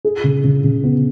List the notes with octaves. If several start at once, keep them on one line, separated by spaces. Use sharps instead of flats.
G#4
C#3
C#3
C#3
B3